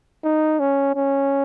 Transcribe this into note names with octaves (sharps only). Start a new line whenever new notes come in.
D#4
C#4
C#4